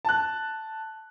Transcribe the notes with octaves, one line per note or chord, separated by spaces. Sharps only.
A5 F#6